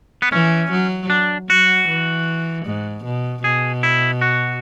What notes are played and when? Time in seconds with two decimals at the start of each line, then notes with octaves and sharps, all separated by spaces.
0.22 B3
0.32 E3 C#4
0.71 F#3
1.10 D4
1.50 F#3 F#4
1.88 E3
2.66 G#2
3.05 B2
3.44 B2 G#4
3.83 E4
4.21 F#4